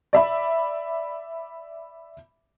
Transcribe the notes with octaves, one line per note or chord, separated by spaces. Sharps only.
D5 E5 B5